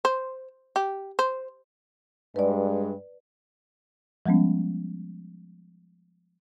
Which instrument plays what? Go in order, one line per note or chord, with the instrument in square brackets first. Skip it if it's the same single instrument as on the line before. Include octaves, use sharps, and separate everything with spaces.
[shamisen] C5
G4
C5
[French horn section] G2 G#3 [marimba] B4 D5
[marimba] F3 G3 G#3 B3 C#4